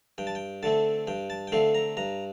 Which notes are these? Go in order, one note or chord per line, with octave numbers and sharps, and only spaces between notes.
G2 G5
A5
G5
D3 A3 C4 A5
G2 G5
A5
G5
D3 A3 C4 F5
A#5
G2 A#5